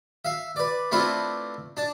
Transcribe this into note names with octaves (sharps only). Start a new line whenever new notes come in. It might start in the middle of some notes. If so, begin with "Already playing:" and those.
E5 F5
B4 D5
A3 C4 D4 E4 F4 B4
D4 A5